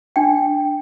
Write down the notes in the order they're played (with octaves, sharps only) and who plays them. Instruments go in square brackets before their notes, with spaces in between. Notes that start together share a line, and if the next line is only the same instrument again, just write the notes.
[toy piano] D4 G5